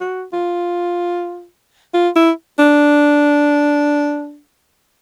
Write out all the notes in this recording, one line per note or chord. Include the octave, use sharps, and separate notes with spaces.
F#4
F4
F4
E4
D4